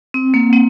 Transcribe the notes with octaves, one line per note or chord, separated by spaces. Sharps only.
C4
A#3
C4